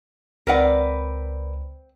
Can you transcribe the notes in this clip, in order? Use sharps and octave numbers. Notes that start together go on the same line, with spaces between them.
C#2 C4 A#4 B4 D5 F#5